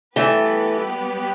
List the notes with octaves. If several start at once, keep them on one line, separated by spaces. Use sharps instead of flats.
E3 G3 A3 B3 G4 B4